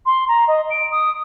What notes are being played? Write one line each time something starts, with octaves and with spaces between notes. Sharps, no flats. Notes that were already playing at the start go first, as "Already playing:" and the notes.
C6
A#5
D#5
D7
D#6